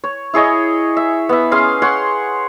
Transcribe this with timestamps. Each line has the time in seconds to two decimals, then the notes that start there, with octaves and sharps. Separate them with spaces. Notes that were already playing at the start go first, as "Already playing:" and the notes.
0.04 C#5
0.34 E4 G#4 C#5 D#5
0.97 E5
1.29 B3 E5
1.52 C#4 G#4 F5 C6
1.82 C#5 F#5 C6